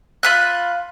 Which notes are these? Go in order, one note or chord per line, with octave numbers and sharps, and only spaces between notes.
F4 B5 F#6